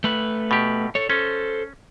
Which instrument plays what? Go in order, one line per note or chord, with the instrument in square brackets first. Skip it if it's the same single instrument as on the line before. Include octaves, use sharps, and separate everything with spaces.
[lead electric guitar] A3 B4
[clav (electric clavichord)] B2 G4
[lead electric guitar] A4 C#5
[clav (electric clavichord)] C#4 [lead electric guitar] A4 C5